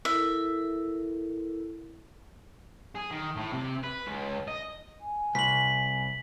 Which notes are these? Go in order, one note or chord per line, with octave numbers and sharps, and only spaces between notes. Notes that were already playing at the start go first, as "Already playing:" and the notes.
E4 A4 A#4 E5
G#4
D#3
A2
C3
B4
C#2
D#5
G#5
C2 B6 F#7